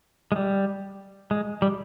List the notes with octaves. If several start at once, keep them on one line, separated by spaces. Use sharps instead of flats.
G#3
G3
G#3
G3